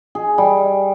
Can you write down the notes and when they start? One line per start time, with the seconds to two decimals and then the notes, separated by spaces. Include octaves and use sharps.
0.15 G#4
0.38 G3